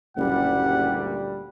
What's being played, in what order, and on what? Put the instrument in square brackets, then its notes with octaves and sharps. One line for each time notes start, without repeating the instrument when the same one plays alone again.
[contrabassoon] F#1 [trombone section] D2 A#2 G3 [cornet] F#5